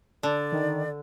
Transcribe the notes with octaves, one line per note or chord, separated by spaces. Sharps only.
D3 D5
D#3